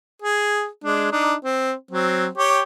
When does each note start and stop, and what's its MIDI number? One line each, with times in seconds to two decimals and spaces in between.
0.22 0.68 68
0.84 1.08 56
0.84 1.08 62
1.12 1.34 62
1.12 1.34 63
1.44 1.73 60
1.91 2.27 54
1.91 2.27 60
2.37 2.63 67
2.37 2.63 73
2.37 2.63 79